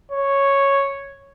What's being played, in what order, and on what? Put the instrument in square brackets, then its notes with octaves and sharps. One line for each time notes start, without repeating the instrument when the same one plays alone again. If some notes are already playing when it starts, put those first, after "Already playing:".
[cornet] C#5